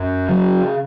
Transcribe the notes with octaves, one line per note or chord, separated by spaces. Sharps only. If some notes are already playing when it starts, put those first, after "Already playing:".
Already playing: F#2
C#3 F#3